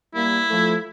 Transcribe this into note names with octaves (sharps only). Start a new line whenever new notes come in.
G3 A#3 E4
F3 A3